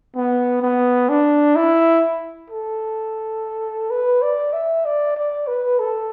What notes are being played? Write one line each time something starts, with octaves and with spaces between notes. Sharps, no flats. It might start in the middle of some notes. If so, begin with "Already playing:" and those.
B3
B3
D4
E4
A4
B4
D5
E5
D5
D5
B4
A4